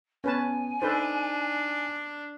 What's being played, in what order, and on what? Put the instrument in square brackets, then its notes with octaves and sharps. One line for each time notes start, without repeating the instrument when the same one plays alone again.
[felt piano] B3 [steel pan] C#4 B4 A5 [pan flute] G#5
[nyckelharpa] D4 [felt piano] D#4 [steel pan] A4 B4 C5